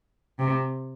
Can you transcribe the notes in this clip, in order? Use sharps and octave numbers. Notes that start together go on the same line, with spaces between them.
C3